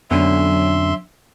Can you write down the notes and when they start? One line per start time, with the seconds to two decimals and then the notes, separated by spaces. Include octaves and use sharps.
0.11 F2 B2 D3 F#3 C#4 E5 C6